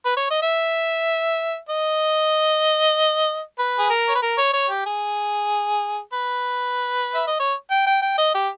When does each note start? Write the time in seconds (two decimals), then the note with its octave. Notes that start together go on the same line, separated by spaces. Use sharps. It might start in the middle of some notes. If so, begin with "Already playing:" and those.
0.05 B4
0.17 C#5
0.30 D#5
0.42 E5
1.69 D#5
3.59 B4
3.79 G#4
3.90 A#4
4.09 C#5
4.15 B4
4.22 A#4
4.38 C#5
4.54 C#5
4.69 G4
4.86 G#4
6.13 B4
7.15 E5
7.27 D#5
7.40 C#5
7.71 G5
7.87 G5
8.02 G5
8.18 D#5
8.35 G4